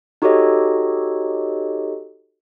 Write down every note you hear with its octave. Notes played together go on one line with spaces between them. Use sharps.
D#4 F#4 G4 A4 C#5 D#5